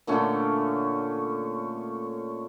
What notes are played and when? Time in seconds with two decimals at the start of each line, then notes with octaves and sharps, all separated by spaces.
0.07 A#2 D3 A3 C#4